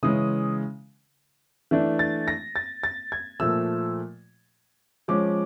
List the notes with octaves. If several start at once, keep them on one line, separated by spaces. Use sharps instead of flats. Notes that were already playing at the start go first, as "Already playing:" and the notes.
C#3 E3 G#3 C#4 D#6
E3 A3 D4
A6
A#6
A6
A6
G#6
A#2 F3 A3 E6
F3 G#3 C#4 D6